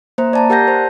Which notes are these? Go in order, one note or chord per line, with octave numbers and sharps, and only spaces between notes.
A#3 C5 A#5
D5 A5 A#5
G4 A#4 F#5 A5 G6 A#6
C5